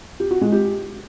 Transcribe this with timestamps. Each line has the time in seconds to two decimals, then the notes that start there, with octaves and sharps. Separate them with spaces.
0.20 G4
0.31 F#4
0.42 G#3
0.52 G4